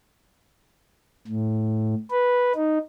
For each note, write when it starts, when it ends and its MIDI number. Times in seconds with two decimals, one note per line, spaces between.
1.28 1.95 45
2.11 2.53 71
2.55 2.78 63